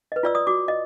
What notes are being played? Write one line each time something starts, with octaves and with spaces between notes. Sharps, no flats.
B4 D#5
F4 D5 E6
D5 D#6
F#4 D6
D#5